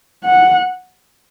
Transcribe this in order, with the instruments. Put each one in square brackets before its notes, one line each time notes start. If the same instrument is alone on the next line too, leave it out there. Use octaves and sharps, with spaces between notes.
[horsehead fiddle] F#5